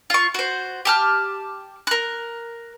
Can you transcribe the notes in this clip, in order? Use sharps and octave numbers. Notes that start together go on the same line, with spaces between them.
F4 C#6
F#4 C5
G4 A5 F6
A#4 F#6